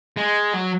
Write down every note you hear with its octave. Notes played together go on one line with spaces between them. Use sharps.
G#3
F#3